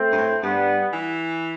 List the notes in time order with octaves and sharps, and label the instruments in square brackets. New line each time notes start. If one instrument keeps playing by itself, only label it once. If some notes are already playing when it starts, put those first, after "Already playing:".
Already playing: [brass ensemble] A3 C4
[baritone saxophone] G2
A2
[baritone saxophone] G2 [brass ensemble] G3 B3
[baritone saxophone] E3